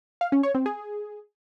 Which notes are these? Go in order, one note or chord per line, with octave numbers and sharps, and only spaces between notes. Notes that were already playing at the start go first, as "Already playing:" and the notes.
F5
C#4
C#5
C4
G#4